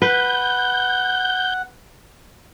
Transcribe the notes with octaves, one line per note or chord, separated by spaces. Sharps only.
B4 F#5 G6